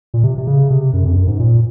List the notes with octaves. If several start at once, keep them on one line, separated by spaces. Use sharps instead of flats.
A#2
C3
C3
C#3
C3
F#2
F2
F#2
G#2
A#2